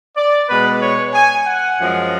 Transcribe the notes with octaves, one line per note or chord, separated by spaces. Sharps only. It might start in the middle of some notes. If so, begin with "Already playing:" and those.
D5
B2 G#3 B3 B4
C#5
G#5
F#5
F#2 F3 G#3